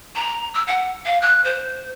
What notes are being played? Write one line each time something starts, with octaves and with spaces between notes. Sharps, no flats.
A#5
E6
F#5
F5
F#6
C5